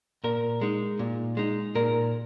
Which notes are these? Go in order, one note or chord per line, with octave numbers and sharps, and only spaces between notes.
A#2 A#4
G#3 D#4
A#2
G#3 D#4
A#2 A#4